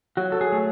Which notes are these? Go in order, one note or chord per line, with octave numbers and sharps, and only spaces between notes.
F#3 F#4
A4
G#4
A3